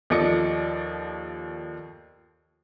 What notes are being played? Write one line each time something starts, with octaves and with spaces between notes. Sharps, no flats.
D#2 F3 A4 D5 D#5 C#7